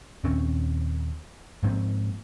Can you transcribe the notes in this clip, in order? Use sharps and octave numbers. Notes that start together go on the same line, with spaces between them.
D#2 A#2 C4 C#4
G#2 F3 A#3 C4